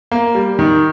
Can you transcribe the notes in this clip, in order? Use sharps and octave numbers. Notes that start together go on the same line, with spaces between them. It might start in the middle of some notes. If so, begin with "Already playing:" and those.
A#3
G3
D#3